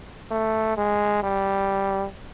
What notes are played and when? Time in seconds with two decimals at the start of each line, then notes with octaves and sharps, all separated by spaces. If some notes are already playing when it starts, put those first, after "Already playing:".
0.31 A3
0.77 G#3
1.23 G3